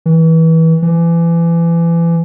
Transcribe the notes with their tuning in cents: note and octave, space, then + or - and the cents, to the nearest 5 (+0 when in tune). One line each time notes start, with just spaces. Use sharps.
E3 -25
E3 +30